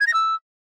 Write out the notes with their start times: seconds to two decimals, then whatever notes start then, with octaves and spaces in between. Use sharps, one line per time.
0.01 G#6
0.07 A#6
0.14 E6